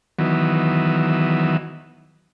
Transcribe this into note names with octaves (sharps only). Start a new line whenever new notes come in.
D#3 E3 F#3 B3